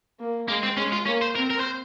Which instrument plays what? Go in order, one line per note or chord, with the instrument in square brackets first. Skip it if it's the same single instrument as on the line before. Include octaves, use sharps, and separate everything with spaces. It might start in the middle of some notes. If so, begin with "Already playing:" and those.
[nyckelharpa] A#3
[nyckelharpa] G#3 [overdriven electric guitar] A#3
[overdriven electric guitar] C4
[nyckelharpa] G#3 [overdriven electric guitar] C#4
[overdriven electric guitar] F4
[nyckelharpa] A#3 [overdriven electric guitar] C#4
[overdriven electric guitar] C5
[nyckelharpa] C4 [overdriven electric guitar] A#4
[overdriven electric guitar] A#4
C5